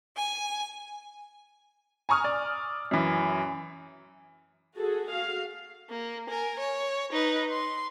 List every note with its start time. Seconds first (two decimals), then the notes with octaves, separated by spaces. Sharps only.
0.17 G#5
2.09 G#5 A#5 C#6 D#6 F6
2.24 D5
2.91 F#2 E3
4.76 F#4 G#4 A4
5.11 F#4 F5
5.89 A#3
6.29 A#4 G#5
6.59 C#5
7.13 D#4 B4
7.51 C6